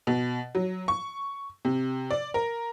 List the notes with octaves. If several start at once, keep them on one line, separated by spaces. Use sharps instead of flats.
B2
F#3
C#6
C3
D5
A#4